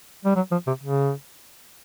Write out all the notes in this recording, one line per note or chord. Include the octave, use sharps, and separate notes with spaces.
G3
F#3
F3
C3
C#3